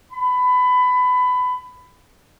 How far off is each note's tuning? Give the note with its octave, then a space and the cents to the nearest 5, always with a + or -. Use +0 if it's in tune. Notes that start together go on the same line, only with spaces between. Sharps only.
B5 +20